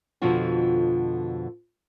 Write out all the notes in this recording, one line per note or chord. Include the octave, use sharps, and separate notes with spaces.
F2 B2 D3 F3 F4 F#4